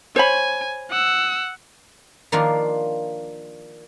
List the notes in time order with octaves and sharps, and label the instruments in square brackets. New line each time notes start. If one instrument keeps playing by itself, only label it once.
[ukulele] C5 C#5 B5 [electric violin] G#5
[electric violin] F#5 E6
[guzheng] D#3 F3 A#3 D4 F4 A#4